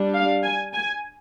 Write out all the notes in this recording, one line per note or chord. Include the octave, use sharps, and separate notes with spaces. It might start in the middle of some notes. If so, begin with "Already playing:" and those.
Already playing: G3 D4
F5
G#5
G#5